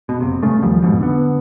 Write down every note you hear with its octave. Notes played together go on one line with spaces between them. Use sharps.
B2
F#1 C3
G2 C#3 A3
D#2 F3 G3
A1 F2 G#2 B2
D3 B3